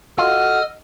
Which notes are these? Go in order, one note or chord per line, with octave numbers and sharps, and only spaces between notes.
F4 F#4 A4 D#5 F6